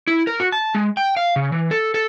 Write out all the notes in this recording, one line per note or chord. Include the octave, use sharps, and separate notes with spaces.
E4
A#4
F#4
A5
G#3
G5
F5
C#3
E3
A4
A4